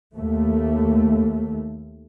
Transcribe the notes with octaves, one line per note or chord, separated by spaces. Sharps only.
D#2 A3